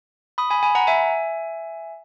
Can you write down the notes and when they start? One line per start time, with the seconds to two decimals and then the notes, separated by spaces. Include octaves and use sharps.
0.38 B5 D#6
0.50 G#5 B5
0.63 G#5 B5
0.75 F#5 A#5
0.87 E5 G#5